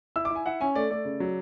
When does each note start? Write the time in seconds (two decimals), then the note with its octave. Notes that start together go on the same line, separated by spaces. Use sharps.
0.16 E4 E6
0.25 D6
0.30 E4
0.35 G#5
0.46 E4 F#5
0.61 C#4 G#5
0.75 A3 D5
0.90 A3 D5
1.05 C#3
1.20 F#3